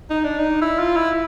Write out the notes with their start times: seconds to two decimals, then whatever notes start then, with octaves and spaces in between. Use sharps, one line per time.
0.10 D#4
0.24 D4
0.38 D#4
0.61 E4
0.79 F4
0.96 E4